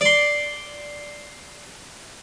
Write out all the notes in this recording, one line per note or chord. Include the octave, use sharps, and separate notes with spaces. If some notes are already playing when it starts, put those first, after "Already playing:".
D5 C6